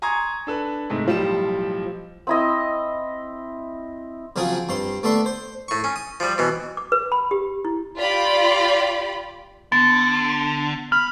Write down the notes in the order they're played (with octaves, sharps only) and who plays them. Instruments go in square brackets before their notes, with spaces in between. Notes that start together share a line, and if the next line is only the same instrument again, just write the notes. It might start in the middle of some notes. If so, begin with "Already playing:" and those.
[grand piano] G#5 A#5 C6 C#6 D#6 G#6
D4 A4 B4
G#2 C3 G#3 A3
B1 A2 F3 G3 G4 E7
[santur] C4 E4 D#5
[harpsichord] C#3 F3 F#3 C4 G#4 D#6
G2 C4 C6
A3 B3 D4 E5 C6
C5
A2 C#6
C#4
D#6
F3 G3
B2 E3
[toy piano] D6
B4
B5
G4
E4
[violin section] F4 G4 D5 B5
[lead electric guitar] D3 [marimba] B3 [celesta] A6
[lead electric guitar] B5 [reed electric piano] F6